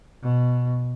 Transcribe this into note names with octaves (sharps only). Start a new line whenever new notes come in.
B2